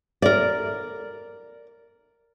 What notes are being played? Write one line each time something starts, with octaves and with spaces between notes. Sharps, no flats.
A#4 D5